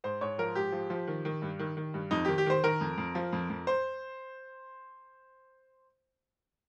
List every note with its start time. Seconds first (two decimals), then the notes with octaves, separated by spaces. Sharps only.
0.04 G#2 C5
0.21 G#2 C#5
0.38 F3 A#4
0.55 G#2 G4
0.72 F3
0.90 F3
1.07 D#3
1.25 D#3
1.42 G2
1.59 D#3
1.77 D#3
1.94 G2
2.11 F2 D#4
2.25 D#3 G4
2.38 G4
2.46 D#3 C5
2.63 D#3 A#4
2.81 F2
2.98 F2
3.15 F3
3.33 F2
3.50 F2
3.67 C5